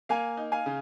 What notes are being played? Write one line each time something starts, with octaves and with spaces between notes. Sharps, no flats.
A#3 F5 G#5
D#4
F5 G#5
C#3